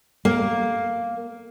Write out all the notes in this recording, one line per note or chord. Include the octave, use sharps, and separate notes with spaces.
A#3